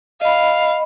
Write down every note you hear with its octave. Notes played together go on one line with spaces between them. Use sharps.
D#5 F5 B5